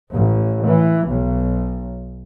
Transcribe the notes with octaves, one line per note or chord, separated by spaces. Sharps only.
A1
E3
B1